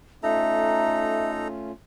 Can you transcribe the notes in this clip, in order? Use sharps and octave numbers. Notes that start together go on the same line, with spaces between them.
A3 C#4 D#4 F4 A4 E5 A#5